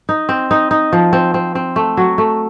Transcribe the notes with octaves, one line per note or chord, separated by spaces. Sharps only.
D#4
C4
D#4
D#4
F3
C4
C4
C4
A3
F#3
A3